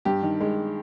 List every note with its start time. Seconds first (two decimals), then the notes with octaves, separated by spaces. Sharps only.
0.05 G2 G4
0.23 D#3
0.40 G#3